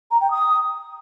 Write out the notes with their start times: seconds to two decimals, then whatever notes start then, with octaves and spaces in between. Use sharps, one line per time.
0.11 A#5
0.20 G5
0.30 D#6